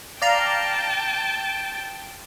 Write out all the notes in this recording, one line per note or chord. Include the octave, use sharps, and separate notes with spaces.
D5 F5 G5 A5 A#5